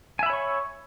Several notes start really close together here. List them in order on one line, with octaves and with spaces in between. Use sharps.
G#5 E5 B5 C#5 C#6